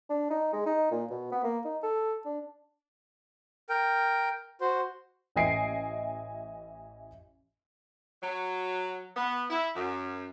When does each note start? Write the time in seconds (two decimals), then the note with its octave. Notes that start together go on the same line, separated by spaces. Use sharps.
0.10 D4
0.30 D#4
0.53 G#3
0.66 D#4
0.91 A#2
1.10 B2
1.32 B3
1.44 A#3
1.65 D#4
1.83 A4
2.25 D4
3.69 A#4 G5
4.61 F#4 C5
5.36 A1 E3 D#5 G#5 C7 D7
8.22 F#3
9.17 B3
9.49 E4
9.75 F#2